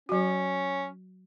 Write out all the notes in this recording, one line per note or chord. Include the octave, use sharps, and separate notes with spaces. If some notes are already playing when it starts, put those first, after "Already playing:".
F#3 C#4 F#4